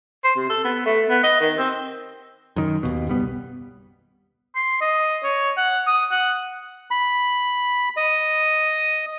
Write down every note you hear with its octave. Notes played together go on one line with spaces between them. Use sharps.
C5
C3
A4
B3
A3
B3
D#5
D#3
C4
F#2 D#3
D#2 B2
F#1 B1 G3 B3
C6
D#5
C#5
F#5
D#6
F#5
B5
D#5